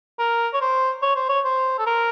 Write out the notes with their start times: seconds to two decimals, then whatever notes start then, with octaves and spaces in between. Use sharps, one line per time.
0.19 A#4
0.54 C#5
0.61 C5
1.02 C#5
1.15 C5
1.29 C#5
1.45 C5
1.79 A4
1.86 A#4